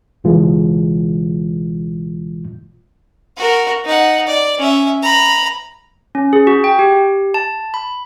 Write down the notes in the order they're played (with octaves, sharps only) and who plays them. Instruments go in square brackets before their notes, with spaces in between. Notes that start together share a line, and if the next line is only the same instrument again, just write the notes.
[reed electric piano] C#2 B2 E3 G#3 F4
[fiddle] F#4 A#4
D#4 F#5
D5
C#4 E5
A#5 B5
[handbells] C#4
G#4
F#4
G5
G4
A5
B5